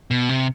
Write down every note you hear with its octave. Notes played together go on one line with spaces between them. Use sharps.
B2
C3